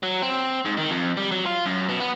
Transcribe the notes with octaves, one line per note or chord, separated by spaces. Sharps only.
F#3
C4
G#2
D#3
F2
G3
F#3
F4
F#2
B2
B3